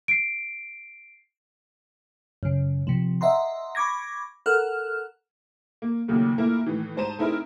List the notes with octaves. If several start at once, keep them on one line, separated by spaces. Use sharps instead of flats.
C7 D7
F#2 C#3
C3 F3
D#5 E5 F#5 A#5 C6
B5 C#6 D6 G#6 A#6
A4 A#4 F#5 F6 F#6
A#3
D#2 A#2 C#3 F#3 A3 A#3
A#2 A3 A#3 E4 A#4
A2 D#3 E3
G#2 C5 A5 A#5 D#7 E7
A3 C4 D#4 E4 G#4 A#4